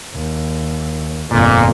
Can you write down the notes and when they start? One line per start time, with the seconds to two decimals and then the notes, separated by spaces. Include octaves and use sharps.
0.15 D#2
1.32 G1 F2 A#2